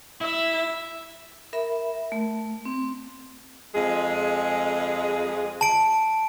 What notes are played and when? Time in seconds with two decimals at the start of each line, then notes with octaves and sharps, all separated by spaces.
0.21 E4 E5
1.53 A#4 E5 B5
2.12 A3
2.65 C4
3.74 F2 G#3 G#4
5.61 A5 D7